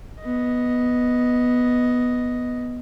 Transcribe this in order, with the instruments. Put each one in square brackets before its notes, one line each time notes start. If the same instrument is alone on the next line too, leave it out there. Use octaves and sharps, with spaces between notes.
[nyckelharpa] B3 D#5